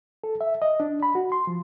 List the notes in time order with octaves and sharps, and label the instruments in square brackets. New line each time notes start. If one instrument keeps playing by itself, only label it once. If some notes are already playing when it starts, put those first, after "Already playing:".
[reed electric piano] A4
E5
D#5
D4
B5
F#4
C6
F3